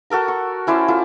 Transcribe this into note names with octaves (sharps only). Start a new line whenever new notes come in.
F#4 A4 A#4 A#5
C#6
C#4 E4 C5 D5
E4 F4 A4